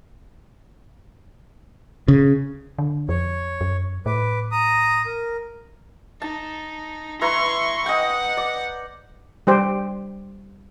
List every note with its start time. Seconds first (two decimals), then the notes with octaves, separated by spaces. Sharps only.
2.08 C#3
2.78 D3
3.09 F2 C#5
3.61 F#2
4.06 A2 B4 D6
4.52 A#5 D#6
5.06 A#4
6.22 D#4 A5
7.21 E4 B4 A#5 C6 C#6
7.86 D#5 F#5 G5
8.37 D5
9.47 G3 G4 C5